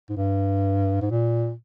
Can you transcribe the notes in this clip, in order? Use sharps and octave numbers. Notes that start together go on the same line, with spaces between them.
G#2
G2
G#2
A#2